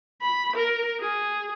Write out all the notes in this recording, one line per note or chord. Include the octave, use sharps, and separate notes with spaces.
B5
A#4
G#4